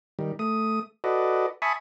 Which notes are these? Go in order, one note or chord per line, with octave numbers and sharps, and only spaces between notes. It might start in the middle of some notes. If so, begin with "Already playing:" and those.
D#3 G3
A3 D#6
F#4 A4 B4 D5 D#5
E5 G#5 A5 B5 C#6 D#6